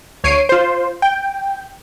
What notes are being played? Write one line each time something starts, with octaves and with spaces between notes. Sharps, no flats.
D2 C#5 C7 D7 D#7
F4 C5
G5